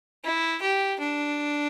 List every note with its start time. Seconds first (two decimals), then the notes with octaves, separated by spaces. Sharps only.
0.24 E4
0.61 G4
1.00 D4